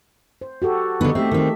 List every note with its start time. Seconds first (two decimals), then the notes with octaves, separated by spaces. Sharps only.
0.41 C5
0.62 F#4 G4 A4
1.01 D3 B3 D#4
1.15 A3 C4 G4 E5
1.31 D#3 C4